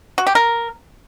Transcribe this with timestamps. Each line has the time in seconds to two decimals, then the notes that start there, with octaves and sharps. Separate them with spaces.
0.18 F#4
0.27 G4
0.35 A#4